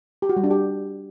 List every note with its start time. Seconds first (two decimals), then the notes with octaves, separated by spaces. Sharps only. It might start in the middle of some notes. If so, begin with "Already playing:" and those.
0.22 G4
0.29 F#4
0.37 G3
0.44 D4
0.51 G4